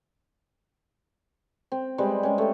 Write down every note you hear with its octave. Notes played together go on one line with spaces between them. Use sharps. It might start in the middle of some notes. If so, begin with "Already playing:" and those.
C4
G3 G#3 C4 B4
G#3 C#4
A3 C4